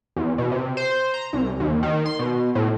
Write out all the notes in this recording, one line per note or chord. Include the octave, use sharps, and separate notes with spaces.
E2
B2
C3
C5
A#5
C2
D#2
D#3
C6
B2
A2